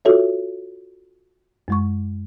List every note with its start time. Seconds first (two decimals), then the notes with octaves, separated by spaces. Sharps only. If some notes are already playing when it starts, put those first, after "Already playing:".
0.05 F4 F#4 A4 C#5 E5
1.68 F#2 G#3 C#6